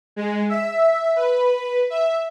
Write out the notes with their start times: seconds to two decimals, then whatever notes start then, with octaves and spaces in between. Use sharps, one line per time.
0.16 G#3
0.49 E5
1.16 B4
1.90 E5